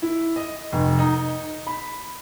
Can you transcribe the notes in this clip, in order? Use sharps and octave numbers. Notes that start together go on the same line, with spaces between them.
E4
D#5
F1
D#4
B5